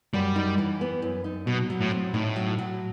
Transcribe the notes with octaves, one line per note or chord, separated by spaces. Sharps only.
F#2 G3
D#4
E3
B3
F#2
D#4
B2 F#3
F#3
A2
C4
A2 D#4
F#3
F#3